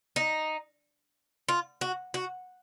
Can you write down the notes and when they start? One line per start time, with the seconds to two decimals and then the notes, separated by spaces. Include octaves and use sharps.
0.16 D#4
1.49 F4
1.81 F#4
2.14 F#4